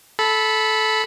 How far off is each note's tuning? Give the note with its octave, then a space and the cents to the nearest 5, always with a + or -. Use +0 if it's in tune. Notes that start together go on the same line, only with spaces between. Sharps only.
A4 -15 B5 +0